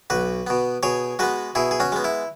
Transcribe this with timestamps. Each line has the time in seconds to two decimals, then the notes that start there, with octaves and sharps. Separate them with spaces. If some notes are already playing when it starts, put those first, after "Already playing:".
0.10 B1 F#4 B4
0.47 B2 B3
0.83 B2 G#4 C#5
1.19 G#3 B3 F#4 B4
1.55 B2 E4 G#4
1.71 G#4
1.80 C#4 F#4
1.92 G#3 B3
2.04 E4